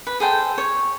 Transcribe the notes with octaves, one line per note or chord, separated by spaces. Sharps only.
B4
G#4 A4 C5 G5
C#5